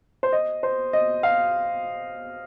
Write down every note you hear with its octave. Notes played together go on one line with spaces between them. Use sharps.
C5
D#5
C5
D#5
F5